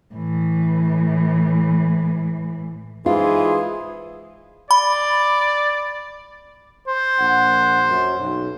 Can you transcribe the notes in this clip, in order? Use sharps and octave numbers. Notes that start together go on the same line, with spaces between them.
A2 E3
G#2 E3 F4 G#4 F5 C6
D5 B5
C5
A#1 F#5
F#2
B1